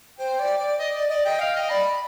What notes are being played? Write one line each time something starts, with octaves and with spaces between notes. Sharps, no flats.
C5 G5
D5
D5
D5 D#5
D5 D#5
D5 D#5
D#5 G5
F5 G5
D#5
D5 B5